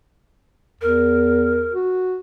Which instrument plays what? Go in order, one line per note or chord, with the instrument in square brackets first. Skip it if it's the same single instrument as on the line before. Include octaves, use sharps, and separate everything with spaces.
[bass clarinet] E2 [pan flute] A#4
[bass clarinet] F#4